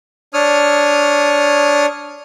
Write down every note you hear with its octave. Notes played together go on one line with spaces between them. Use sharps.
D4 C#5 D#6 F6